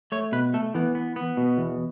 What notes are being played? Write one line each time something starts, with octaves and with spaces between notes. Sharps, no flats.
A3 C#5
B2 B4
A3 A4
E3 B3
B3
B3
B2
E2